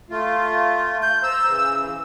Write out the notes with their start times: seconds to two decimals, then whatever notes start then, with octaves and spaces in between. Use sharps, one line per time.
0.10 A3 F4
1.02 G6
1.23 C5 A#5 E6
1.47 C#3 E3